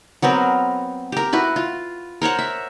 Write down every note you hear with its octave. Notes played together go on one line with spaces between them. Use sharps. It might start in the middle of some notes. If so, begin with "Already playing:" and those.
F#3 B3 C4 A#4
G4 A#4
E4 F#4 B4
F4
A#4 C5 C#5 F#5
E5